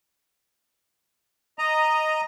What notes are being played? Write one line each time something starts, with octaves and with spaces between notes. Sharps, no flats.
D#5 A#5